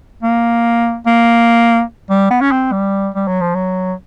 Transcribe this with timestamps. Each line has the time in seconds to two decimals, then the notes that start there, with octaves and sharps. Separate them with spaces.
0.23 A#3
1.07 A#3
2.10 G3
2.30 B3
2.41 C#4
2.52 C4
2.72 G3
3.14 G3
3.28 F#3
3.41 F3
3.55 F#3